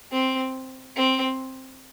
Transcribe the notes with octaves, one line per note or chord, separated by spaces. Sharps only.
C4
C4